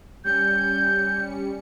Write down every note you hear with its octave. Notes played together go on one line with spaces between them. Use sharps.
G3 C#4 G6 C#7